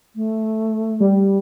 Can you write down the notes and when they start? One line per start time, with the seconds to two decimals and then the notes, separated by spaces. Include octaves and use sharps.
0.16 A3
1.00 G3